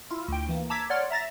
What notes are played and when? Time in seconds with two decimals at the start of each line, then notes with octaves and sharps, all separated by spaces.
0.10 E4 F4
0.28 D2 G5
0.49 E3 A#3
0.70 A5 A#5 D6 E6 G#6 B6
0.90 C#5 D5 F#5 C6 F6 A6
1.10 E5 A#5 A6 A#6